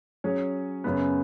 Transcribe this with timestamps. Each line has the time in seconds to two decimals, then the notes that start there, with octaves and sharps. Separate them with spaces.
0.24 F#3 C#4 G#4 C#5
0.84 F#2 C#3 B3